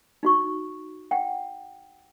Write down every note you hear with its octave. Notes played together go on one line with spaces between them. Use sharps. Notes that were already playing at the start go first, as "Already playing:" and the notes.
D#4 F#4 C#6
F#5 G5